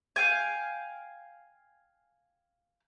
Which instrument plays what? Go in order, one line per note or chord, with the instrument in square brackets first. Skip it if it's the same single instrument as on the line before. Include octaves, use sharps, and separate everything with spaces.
[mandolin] F5 G5 G#5